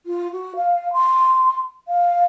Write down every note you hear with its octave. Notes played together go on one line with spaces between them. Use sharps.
F4
F#4
F5
C6
F5